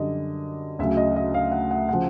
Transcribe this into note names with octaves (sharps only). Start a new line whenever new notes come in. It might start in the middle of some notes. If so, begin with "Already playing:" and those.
Already playing: F#2 D3 G3 D#5
D2 C#3 F#3 E5
D#5
D#5
F5
F#5
F#5
C#3 F3 F#5